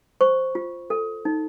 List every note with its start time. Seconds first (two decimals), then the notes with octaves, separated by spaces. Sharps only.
0.21 C5 C#6
0.55 F4
0.90 A4
1.25 D#4